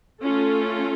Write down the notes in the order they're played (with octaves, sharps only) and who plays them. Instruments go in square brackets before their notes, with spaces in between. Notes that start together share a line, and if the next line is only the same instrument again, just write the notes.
[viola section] A3 C#4 F4 A4